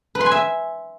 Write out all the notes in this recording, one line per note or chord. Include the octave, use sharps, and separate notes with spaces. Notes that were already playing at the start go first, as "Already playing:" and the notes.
B4
C6
G#5
E5